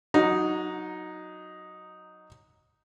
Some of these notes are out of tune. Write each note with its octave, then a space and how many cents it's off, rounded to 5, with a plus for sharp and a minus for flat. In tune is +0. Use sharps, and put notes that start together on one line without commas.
F#3 +0 D#4 +0 F#5 -30